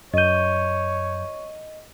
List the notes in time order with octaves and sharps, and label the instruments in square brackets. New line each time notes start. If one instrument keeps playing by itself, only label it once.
[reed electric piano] F#2 G6 [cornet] C#5 [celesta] D#5 D#7